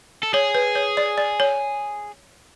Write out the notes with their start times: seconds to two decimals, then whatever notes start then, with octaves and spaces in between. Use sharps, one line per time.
0.23 A4
0.34 G#4 C#5
0.55 B4
0.75 C#5
0.97 D5
1.18 D5
1.40 C#5